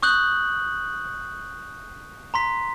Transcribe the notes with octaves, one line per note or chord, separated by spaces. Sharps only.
C#6 D#6 F#6 G6 F#7
A#5 C6 B6